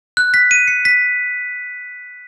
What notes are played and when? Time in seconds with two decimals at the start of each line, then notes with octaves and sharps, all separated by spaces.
0.17 F#6
0.34 B6
0.51 D#7
0.68 C#7
0.85 B6